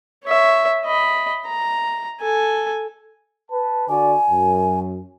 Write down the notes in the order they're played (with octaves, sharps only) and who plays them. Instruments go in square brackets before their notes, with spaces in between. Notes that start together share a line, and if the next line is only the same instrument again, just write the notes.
[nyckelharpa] C#5 E5
D#5 B5
A#5
A4 G#5
[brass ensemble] B4 A5
[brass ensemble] D3 F#4 D5 [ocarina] G#5
[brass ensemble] F#2